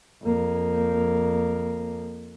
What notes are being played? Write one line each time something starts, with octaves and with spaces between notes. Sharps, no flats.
F2 A#3